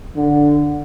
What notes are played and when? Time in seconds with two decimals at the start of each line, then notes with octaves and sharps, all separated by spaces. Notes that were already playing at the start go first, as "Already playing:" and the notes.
0.16 D3